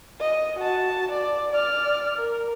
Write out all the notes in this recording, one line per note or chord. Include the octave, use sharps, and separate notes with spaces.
D#5
F#4 A5
D5
D5 F6
A#4